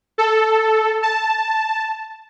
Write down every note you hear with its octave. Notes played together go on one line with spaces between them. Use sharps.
A4
A5